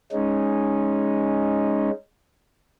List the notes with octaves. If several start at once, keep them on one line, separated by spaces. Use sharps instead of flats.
G#3 C#4 D#4